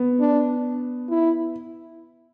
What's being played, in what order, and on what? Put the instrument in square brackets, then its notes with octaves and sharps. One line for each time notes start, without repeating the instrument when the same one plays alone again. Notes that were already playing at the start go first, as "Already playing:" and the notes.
Already playing: [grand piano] B3
[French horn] D4
E4